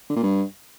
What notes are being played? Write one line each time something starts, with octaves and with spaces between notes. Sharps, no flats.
D3
A#2
G2